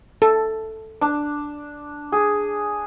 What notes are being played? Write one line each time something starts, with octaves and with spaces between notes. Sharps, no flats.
A4
D4
G#4